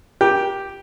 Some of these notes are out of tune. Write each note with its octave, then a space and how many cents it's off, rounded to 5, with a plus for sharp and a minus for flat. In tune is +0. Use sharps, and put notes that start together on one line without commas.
G4 +0 A#4 +40